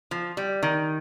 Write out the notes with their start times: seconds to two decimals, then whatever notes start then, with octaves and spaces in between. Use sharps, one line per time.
0.11 F3
0.37 G3
0.63 D#3